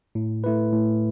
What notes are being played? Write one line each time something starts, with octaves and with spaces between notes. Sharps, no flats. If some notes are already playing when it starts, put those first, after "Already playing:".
A2
A3 E4 B4
A2